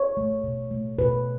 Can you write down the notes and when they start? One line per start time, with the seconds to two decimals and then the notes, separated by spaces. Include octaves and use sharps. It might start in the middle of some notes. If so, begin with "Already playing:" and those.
Already playing: C#5
0.17 A3
0.44 B2
0.71 A3
0.99 B2 B4